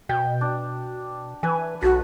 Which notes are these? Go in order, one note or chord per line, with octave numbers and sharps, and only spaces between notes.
B2 G5
D4
E3 B4 G#5
B1 F#4 A4